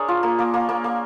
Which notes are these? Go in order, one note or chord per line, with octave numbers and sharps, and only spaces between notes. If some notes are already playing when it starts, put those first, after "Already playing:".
Already playing: D4 G#4 A#4 C#5
F4
A#3
A#3
A#3
A#3
A#3